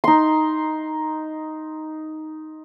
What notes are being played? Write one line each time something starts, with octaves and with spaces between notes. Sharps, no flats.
D#4 C6